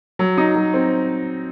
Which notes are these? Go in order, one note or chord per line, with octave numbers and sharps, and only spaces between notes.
F#3
D#4
F#3
C4